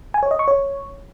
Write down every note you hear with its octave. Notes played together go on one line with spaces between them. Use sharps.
G#5
C#5
D#5
C#6
C#5